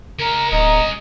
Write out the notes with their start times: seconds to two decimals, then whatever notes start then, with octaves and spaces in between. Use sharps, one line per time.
0.19 G#3 C#4 A#4
0.52 D1 D#5 A#5